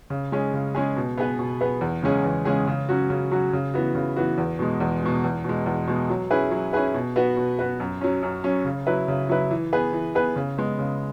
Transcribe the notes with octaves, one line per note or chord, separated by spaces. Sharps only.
C#3
G#3 C#4 G#4
C#3
G#3 C#4 G#4
B2
B3 G#4 B4
B2
B3 G#4 B4
E2
C#3 G#3 C#4 G#4
E2
C#3 G#3 C#4 G#4
C#3
F#3 C#4 F#4
C#3
F#3 C#4 F#4
C#3
E3 B3 F#4
C#3
E3 B3 F#4
E2
B2 G#3
E2
B2 G#3
E2
B2 G#3
E2
B2 G#3
F#3
C#4 E4 G#4 B4
F#3
C#4 E4 G#4 B4
B2
B3 F#4 B4
B2
B3 F#4 B4
F#2
F#3 C#4
F#2
F#3 C#4
C#3
F#3 E4 B4
C#3
F#3 E4 B4
E3
B3 G#4 B4
E3
B3 G#4 B4
C#3
G#3 B3
C#3